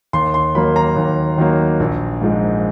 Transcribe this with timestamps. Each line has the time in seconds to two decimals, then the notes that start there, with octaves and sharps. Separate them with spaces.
0.13 D#2 C6
0.34 C6
0.55 D#3 F#3 A#3 B5
0.76 A#5
0.96 D#2
1.38 D#3 F#3 A#3
1.80 A#1
2.21 G#2 F3 G#3